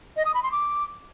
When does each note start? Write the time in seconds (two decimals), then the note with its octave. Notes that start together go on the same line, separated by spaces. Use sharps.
0.17 D#5
0.25 D#6
0.34 B5
0.43 C6
0.52 D6